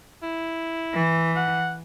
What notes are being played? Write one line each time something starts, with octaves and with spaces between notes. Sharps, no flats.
E4
E3
F#5